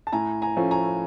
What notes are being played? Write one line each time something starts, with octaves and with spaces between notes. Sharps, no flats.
A5
A2 G#5 A#5
G#5 A#5
F3 A3 C#4
G#5 A#5